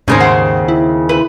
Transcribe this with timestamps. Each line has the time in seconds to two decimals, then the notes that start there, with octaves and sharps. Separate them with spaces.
0.08 D#2 G#2 C#3 C4 C#4 D#4
0.20 C5 F#5
0.68 E4
1.09 E4 B4